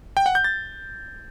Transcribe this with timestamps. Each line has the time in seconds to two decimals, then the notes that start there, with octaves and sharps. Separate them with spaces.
0.17 G5
0.26 F#5
0.35 G6
0.44 A6